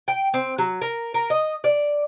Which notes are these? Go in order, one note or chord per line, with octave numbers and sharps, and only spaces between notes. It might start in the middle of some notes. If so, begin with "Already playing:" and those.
G5
C4
F#3
A#4
A#4
D#5
D5